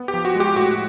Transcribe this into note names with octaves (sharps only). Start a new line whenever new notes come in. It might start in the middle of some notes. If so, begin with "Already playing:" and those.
Already playing: B3
G4
F3
F#4
G#3 G4
A2 F#4